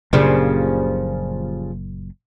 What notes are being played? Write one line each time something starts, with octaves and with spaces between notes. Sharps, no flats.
F#1 A#2 C#3 F3 G3 D4